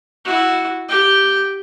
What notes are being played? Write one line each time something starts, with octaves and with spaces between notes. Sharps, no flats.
E4 F#4
G4 G5